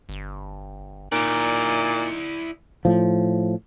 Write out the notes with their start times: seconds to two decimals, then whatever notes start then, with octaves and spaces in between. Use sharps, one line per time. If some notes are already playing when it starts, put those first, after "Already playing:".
0.09 G1
1.12 A#2 D#4 E4 D5
2.85 A2 F3